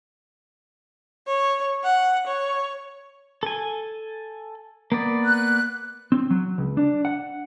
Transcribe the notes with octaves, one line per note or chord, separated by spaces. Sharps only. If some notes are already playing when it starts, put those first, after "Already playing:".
C#5
F#5
C#5
A4 G#5
A#3 B3 D5
F#6
C4
F#3
C#2
D4
F#5